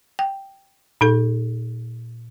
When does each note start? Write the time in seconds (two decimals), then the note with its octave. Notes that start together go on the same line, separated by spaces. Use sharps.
0.19 G5
1.01 A#2 D#4 A4